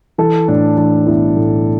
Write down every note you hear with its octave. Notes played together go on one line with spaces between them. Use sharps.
E3 A4
A2 D4
E3 D4
B1 E4
A2